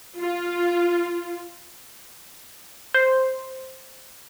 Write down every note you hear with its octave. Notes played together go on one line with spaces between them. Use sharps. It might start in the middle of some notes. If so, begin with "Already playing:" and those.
F4
C5